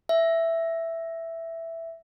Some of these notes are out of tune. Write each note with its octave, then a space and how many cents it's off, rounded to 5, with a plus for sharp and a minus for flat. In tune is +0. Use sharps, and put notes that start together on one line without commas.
E5 +5